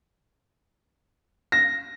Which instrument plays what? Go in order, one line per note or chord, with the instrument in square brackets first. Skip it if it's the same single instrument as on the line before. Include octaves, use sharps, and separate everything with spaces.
[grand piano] A#6